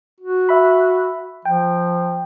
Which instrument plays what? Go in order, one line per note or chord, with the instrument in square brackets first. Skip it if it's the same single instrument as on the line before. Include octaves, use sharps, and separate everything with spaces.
[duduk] F#4
[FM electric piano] E5 B5
[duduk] F3 [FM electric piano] G5